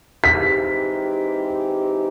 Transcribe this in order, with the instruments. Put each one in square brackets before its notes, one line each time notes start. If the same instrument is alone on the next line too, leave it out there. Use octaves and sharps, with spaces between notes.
[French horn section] E3 G#3 C4 D#4 G4 [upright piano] B6